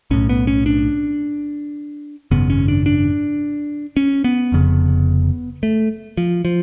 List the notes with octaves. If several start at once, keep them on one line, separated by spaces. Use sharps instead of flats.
B1 A2 C#4
B3
C#4
D4
G#1 F#2 C#3 B3
C#4
D4
D4
C#4
B3
F1 F2 C#3
A3
F3
F3